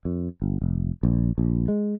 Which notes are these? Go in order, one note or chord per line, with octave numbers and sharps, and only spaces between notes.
F2
G1
F1
A#1
A#1
G#3